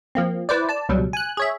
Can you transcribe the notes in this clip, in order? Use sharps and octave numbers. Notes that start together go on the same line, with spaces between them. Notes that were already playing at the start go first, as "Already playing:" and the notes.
F3 A#3 C4
E4 B4 C5 D5
D5 A5
C#2 B2 F#3 G3
G#5 F#6
G#4 C#5 E5